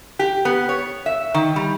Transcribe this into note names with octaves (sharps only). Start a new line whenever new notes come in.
G4
B3
C#5
E5
D#3
G3